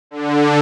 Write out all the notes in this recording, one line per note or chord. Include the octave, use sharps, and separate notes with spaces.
D3